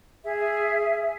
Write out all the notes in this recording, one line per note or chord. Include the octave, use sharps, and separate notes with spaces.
G#4 E5